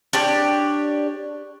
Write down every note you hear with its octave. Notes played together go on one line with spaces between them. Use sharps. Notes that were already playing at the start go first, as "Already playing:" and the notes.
D4 G4 C#5